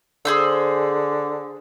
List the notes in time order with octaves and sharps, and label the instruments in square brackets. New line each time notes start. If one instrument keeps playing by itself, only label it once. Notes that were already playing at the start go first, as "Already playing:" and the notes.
[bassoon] D3 [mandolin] G#4 C5 E6